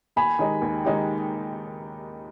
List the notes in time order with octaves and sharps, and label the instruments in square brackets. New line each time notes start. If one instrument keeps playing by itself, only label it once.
[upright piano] D#2 [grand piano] G#5 B5
[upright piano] D#3 G#3 D#4 G4
D#2
D#3 G#3 D#4 G4